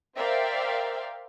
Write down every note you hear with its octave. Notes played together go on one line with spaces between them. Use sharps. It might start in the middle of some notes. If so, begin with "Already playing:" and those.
A#4 C5 D5 E5 F5 G5